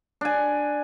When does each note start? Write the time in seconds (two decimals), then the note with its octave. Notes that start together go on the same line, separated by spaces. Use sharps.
0.21 D4 G#5